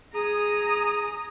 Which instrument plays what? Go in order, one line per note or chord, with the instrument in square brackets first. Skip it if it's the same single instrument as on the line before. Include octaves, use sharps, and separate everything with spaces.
[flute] G#4 [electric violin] A#5 D#6